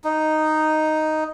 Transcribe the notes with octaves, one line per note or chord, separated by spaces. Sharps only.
D#4